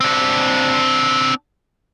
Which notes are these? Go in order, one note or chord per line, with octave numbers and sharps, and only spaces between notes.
C4 D4